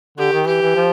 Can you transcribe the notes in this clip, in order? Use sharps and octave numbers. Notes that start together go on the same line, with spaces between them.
D3 G4
D#3
E3 G4
E3
F3